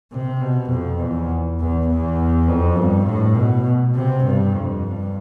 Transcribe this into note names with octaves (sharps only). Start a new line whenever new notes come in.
C3
B2
F2
E2
E2
E2
F2
G2
A2
B2
C3
G2
F2
G2